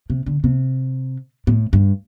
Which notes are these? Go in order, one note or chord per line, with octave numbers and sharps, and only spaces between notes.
C3
D3
C3
A2
G2